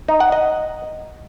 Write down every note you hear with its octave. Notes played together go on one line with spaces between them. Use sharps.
D#4
F#5
D#5